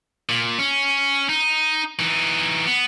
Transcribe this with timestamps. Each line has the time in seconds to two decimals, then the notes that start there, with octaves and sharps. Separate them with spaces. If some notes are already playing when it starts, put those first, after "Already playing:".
0.29 A#2
0.59 C#4
1.29 D#4
1.99 E3 D#4
2.66 B3